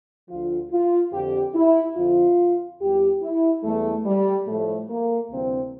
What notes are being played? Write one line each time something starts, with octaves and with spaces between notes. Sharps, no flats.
D2 D3 F3 F4
F4
F2 D3 F3 G4
E4
F2 D3 F3 F4
E2 E3 G3 G4
E4
E2 E3 G3 A3
G3
A2 F3 A3
A#3
D2 C3 E3 G3 C4